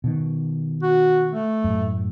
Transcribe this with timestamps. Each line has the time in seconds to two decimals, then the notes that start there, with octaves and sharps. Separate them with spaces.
0.04 B2 D#3
0.82 F#4
1.31 A3
1.64 F#2 A2